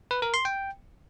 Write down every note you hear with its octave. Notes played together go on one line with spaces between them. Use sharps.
B4
A#4
C6
G5